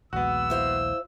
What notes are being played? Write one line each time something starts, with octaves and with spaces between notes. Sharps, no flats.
A#1 D#2 G#3 B3 F#4 E6
E4 C5 F5